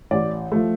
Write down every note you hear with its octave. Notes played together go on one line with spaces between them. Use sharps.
A1 D5
F3 A3